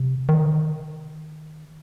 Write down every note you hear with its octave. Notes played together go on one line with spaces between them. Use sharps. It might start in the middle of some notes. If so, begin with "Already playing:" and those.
Already playing: C3
D#3